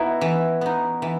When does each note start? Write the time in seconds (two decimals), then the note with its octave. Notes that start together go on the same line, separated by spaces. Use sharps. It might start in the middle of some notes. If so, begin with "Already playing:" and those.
Already playing: B3 D#4 E4 F#4
0.21 E3
0.61 B3 D#4
1.02 E3